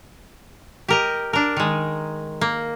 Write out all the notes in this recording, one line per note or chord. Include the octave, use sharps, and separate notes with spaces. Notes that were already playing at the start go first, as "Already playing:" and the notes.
G4 A#4 D#5
D4 A#4
D#3 G#3
A#3